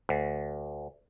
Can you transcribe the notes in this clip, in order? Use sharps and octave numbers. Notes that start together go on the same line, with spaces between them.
D2